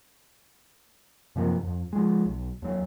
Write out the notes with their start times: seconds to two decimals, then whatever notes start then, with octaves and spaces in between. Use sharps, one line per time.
1.36 F#2 C3 F3 A#3
1.63 F2
1.93 F3 G#3
2.25 B1
2.62 D#2 F#3